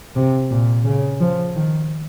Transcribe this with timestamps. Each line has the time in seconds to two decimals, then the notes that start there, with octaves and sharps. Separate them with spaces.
0.16 C3
0.51 A#2
0.85 C#3
1.20 F3
1.55 D#3